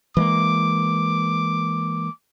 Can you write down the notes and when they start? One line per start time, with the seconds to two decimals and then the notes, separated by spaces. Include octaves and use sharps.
0.17 E3 G#3 A#3 D6